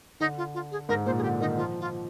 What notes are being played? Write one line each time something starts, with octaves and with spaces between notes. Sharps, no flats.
D3 D#4
F4
F4
G#4
G#2 A#4
A#2 C5
G#4
D3 G4
D#3 D#4
F3 F4
F4